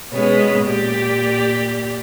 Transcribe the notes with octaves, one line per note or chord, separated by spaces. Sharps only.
B2 G#3 B3 C#4
A#2 G4 D5